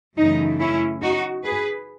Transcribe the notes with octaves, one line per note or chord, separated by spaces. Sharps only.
F#2 C#3 E3 A3 D#4
C#4 E4
D#4 F#4
G#4 B4